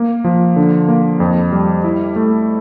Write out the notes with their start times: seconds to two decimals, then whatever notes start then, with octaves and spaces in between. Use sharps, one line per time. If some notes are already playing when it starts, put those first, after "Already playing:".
Already playing: A#3
0.24 F3
0.56 D3
0.88 A#3
1.20 F2
1.52 G3
1.84 E4
2.16 A3